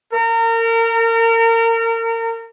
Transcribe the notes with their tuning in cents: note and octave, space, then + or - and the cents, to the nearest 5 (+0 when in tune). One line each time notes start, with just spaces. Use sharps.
A#4 -30